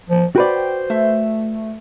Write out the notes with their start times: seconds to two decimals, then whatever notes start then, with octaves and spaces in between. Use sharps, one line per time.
0.10 F3
0.36 F#4 B4 C5 D5 G5
0.90 A3 E5